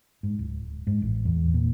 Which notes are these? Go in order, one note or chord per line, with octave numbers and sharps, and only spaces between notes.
G#2
D1
G#2
A1
E2
A#2